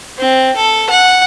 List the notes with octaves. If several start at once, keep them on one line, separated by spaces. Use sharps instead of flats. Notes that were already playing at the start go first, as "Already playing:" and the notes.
C4
A4
F#5